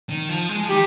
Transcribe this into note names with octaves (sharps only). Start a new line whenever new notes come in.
D#3
F3
G#3
F3
D#3 G4